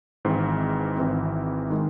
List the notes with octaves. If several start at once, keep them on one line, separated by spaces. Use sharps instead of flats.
G#1 G#2 E3 C4
G#1 G#2 E3 C4
D#3 G#3